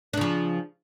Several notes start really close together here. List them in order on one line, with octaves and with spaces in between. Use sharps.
D4 C#3 F3